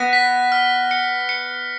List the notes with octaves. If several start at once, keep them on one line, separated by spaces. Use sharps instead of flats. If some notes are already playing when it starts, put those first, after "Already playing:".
Already playing: B3 F#6 A#6
B6
F6
C#7
C#7